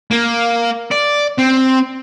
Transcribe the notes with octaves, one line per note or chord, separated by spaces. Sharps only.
A#3
D5
C4